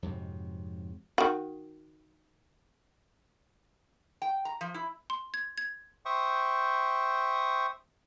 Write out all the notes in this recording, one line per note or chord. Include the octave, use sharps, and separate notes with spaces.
F2 G#2 C3 F#3
D#3 F#4
G5
A#5
F3
E4
C6
G#6
G#6
C5 E5 G5 C#6 D#6